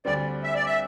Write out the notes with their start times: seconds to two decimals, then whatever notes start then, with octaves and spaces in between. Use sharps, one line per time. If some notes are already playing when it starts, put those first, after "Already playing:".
0.05 D2 D3 G3 C4 D5
0.43 E5
0.54 D5
0.66 E5